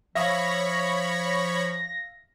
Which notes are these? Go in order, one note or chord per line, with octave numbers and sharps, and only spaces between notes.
F3 C#5 E5 F5 B5 C#6 D#6 A#6